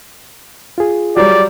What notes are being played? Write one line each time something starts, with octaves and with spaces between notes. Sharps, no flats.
F4 G#4
F#3 G3 D5